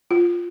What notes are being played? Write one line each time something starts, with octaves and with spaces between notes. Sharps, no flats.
F4